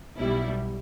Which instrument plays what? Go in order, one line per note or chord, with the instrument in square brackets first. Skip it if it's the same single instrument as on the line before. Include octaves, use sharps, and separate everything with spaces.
[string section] B1 B2 G3 E4